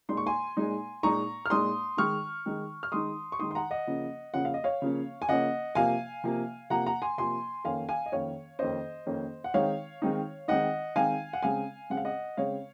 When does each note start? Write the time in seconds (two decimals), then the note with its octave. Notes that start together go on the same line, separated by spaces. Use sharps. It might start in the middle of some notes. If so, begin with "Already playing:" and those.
0.09 A#2 G#3 D#4 C6
0.17 C#6
0.27 G#5 C6
0.57 A#2 G#3 D#4
1.03 A#2 G#3 D#4 A#5 C#6
1.46 F6
1.50 A#2 G#3 D#4 C6 D#6
1.97 D#3 G#3 D#4 C#6 F6
2.46 D#3 G#3 D#4
2.83 F6
2.92 D#3 G#3 D#4 C6 D#6
3.32 C#6
3.40 D#3 G#3 D#4 C6 D#6
3.51 C6
3.55 F#5 A#5
3.71 D#5 F#5
3.87 C#3 F3 A#3 C#4
4.34 C#3 F3 A#3 C#4 F#5
4.45 F5
4.54 D#5
4.64 C#5 F5
4.82 C#3 F3 A#3 C#4
5.22 G#5
5.28 C#3 F3 A#3 C#4 D#5 F#5
5.75 C3 F3 A#3 F5 G#5
6.24 C3 F3 A#3
6.70 C3 F3 A#3 F#5 A#5
6.86 F#5 A#5
7.02 G#5 C6
7.18 C3 F3 A#3 G#5 C6
7.64 F2 D#3 A#3 C#4 F5 G#5
7.89 F5 G#5
8.06 D#5
8.12 F2 D#3 A#3 C#4 C#5 F5
8.59 F2 D#3 A#3 C#4 C5 D#5
9.06 F2 D#3 A#3 C#4
9.44 F#5
9.54 D#3 G#3 C4 D#4 C#5 F5
10.02 D#3 G#3 C4 D#4
10.48 D#3 G#3 C4 D#4 D#5 F#5
10.96 D#3 G#3 C4 D#4 F5 G#5
11.33 F#5
11.43 C#3 G#3 C4 F5 G#5
11.90 C#3 G#3 C4 F#5
11.97 F5
12.05 D#5 F#5
12.37 C#3 G#3 C4 C#5 F5